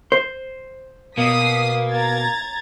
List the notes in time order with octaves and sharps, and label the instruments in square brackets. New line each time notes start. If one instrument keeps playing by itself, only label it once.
[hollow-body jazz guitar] C5
[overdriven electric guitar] B2 [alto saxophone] A#3 [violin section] D#6 B6 C7
[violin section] A#5 G#6 A6